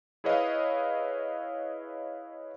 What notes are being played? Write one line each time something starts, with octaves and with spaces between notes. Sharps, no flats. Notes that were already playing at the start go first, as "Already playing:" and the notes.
E4 G#4 B4 C#5 D#5 F5